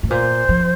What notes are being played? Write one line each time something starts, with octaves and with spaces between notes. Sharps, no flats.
A2
A#2 C5
F3